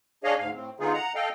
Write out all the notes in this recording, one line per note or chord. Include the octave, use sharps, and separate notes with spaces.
D4 G#4 C#5 D#5 F5
D2 G#2 F5
A2 C4
D3 G#3 B3 D#4 F4 G#4
F#5 A#5
A4 D#5 F5 G5